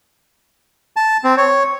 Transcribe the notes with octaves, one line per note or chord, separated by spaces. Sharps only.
A5
C4
C#5